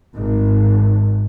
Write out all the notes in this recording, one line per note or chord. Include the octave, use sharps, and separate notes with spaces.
G#1